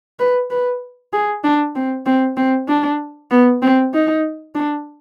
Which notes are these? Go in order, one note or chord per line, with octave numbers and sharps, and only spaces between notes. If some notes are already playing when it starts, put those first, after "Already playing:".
B4
B4
G#4
D4
C4
C4
C4
D4
B3
C4
D#4
D4